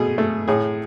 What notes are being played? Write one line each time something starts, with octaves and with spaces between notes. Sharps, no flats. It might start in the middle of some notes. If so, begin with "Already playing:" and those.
Already playing: B2 A3 G#4
A3
A2 G#4